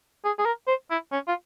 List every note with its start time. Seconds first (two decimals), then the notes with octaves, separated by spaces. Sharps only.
0.25 G#4
0.38 G#4
0.45 A#4
0.67 C5
0.91 E4
1.12 C#4
1.28 F4